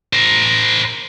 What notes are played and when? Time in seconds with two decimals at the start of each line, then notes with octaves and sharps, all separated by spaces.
0.13 A#4 C5